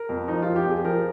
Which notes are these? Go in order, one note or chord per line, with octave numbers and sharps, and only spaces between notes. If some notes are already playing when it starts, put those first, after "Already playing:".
Already playing: A#4
F2
F3 D#4
F3 F4
G4
F2 G#4
F3 A#4